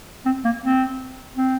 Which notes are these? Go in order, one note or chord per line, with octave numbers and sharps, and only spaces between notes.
C4
A#3
C4
C4